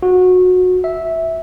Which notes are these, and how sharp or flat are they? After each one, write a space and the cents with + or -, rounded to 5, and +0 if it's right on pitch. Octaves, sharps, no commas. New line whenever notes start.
F#4 -20
E5 -10